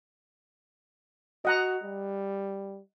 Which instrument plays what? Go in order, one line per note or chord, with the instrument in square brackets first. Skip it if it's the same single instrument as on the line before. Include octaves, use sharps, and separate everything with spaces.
[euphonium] F#4 [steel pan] D#5 F#5 A#5
[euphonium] G3